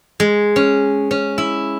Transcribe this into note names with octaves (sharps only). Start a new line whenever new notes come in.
G#3
C#4
C#4
E4